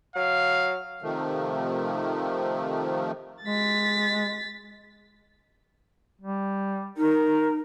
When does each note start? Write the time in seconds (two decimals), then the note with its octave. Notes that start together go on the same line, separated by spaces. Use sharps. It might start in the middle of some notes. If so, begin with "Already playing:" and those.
0.16 F#3 F5
1.02 C3 D#3 F3 A3
3.44 G#3 A6 B6
6.21 G3
6.98 D#4 A#4